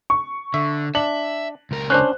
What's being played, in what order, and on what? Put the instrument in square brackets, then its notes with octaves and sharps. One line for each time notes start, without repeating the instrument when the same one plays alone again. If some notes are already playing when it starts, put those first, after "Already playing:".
[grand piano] C#6
[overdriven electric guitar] D3 [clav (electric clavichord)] E5
[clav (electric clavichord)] D4 [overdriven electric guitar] E5 [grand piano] F#7
[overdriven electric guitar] C#2 A#4
[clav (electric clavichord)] C#4 D4 [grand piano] C5 F#6